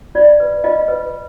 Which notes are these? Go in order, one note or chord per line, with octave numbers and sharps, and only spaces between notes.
F4 D5
B4
F4 D#5
B4